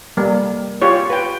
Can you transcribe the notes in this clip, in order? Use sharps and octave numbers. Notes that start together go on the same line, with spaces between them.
G3 A#3
F4 G4 C#5
B4 G5